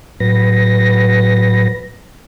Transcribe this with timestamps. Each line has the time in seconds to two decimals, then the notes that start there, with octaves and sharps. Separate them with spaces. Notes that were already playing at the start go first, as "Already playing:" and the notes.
0.20 A2 F#3 B4 A#6